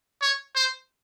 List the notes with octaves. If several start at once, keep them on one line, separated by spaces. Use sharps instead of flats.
C#5
C5